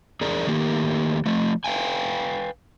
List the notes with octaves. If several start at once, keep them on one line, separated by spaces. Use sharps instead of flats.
E2 G#4 A#4 D5 A#5
D#3 A3 A#3 G4
F3 A3
B4 F5 G5 G#5